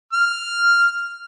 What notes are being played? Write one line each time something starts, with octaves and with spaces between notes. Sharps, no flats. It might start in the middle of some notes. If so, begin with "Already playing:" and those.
F6